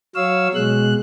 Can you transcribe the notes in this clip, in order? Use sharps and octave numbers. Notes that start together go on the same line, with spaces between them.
F#3 C#5 F5 E6
B2 G#3 F#6